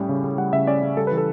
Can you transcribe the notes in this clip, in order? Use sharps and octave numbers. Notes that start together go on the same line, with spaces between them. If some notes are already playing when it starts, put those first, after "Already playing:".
Already playing: A2 G3 C#4
C#3
C#3
G3 F#5
C#3 E5
C#4 D5
C#3
G3 A4
E3 B4
A4